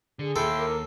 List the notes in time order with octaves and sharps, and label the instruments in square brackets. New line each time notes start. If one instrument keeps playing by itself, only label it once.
[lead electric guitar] D3 [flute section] G#4
[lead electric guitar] D#2 [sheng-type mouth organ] E4 G5 C6 [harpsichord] A4
[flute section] A#4 D6